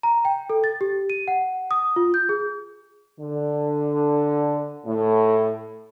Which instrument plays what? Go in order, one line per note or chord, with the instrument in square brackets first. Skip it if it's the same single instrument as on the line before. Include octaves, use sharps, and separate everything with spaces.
[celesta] A#5
G5
A4
A6
G4
D#7
F#5
D#6
F4
G6
G#4
[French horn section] D3
A2